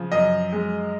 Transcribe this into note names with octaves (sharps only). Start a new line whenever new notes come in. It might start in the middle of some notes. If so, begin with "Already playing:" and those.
Already playing: C#3 F3
F#2 D#5
G#3